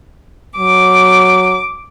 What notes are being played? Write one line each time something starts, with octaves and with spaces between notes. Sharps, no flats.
F#3 D6